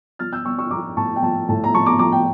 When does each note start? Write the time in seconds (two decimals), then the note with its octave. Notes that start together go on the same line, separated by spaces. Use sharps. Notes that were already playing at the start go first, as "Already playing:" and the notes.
0.19 F3 F6 A6
0.33 E6 G6
0.45 F3 C#6 E6
0.59 C#6 E6
0.71 F3 A#5 D6
0.97 A2 A5 C#6
1.16 G5
1.22 F3 A5
1.49 A2 A5
1.64 A#5
1.74 F3 A5 C#6
1.86 A#5 D6
1.99 F3 A#5 D6
2.12 G5